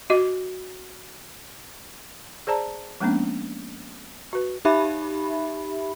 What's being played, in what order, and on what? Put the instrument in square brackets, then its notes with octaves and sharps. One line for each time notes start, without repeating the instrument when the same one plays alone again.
[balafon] F#4 D#5
G#4 C5 D5 A5 A#5
F3 G#3 A#3 B3 C#4 D4
F#4 B4
[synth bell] D#4 G4 E5 B5